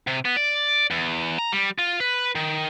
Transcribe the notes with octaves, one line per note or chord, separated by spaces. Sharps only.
C3
B3
D5
E2
A#5
G3
F4
B4
D#3